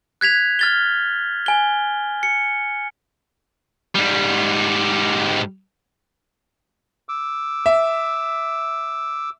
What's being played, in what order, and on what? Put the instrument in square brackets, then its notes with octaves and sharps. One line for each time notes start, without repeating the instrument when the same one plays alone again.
[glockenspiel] F#6 G#6 B6 F7
F6 A6 G7
G#5 G7
C#7
[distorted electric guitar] G#2 G3
[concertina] D6 E6
[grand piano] E5